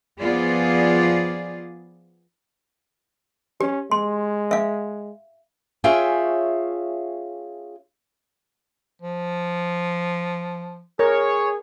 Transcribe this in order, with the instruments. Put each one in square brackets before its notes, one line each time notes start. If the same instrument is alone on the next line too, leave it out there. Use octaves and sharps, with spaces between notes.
[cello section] F3 B3 F4 G#4 D5
[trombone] C#4 [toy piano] G4
[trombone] G#3 [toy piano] C6
[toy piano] E5 F5
[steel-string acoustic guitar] C#4 F4 G#4 C#5 E5 G5
[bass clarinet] F3
[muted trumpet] G#4 [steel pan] A#4 [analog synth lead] C#5